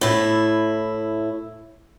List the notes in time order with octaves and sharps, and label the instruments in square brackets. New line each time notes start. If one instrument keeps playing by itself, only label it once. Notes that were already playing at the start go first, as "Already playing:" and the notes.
[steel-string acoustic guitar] A2 E4